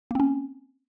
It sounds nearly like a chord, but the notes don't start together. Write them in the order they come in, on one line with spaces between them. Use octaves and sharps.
A#3 C4 C#4